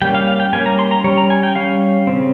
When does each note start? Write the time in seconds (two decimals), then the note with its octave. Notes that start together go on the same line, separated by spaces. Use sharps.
0.02 G3 A#3 C#4 G5
0.15 F5
0.28 F5
0.40 G5
0.53 G3 A#3 C#4 G#5
0.66 A#5
0.79 C6
0.91 A#5
1.04 G3 C#5
1.07 C#4
1.18 A#5
1.30 G#5
1.43 G5
1.56 G3 C#4 F5
2.07 C#3 F3 C4